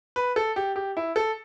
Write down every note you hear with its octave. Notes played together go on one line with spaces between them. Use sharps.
B4
A4
G4
G4
E4
A4